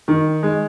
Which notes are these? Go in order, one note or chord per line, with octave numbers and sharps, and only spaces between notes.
D#3
G#3